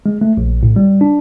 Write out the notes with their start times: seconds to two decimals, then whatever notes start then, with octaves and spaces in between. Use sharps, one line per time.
0.06 G#3
0.21 A3
0.37 A#1
0.63 A2
0.76 G3
1.01 D4